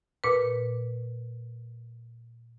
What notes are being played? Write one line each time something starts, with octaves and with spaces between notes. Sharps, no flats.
A#2 B4